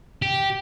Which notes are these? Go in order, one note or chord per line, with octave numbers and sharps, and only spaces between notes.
G4